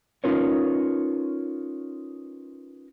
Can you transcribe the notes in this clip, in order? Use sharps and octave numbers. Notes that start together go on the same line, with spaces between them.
C#4 D#4 F4 A#4 B4 C#5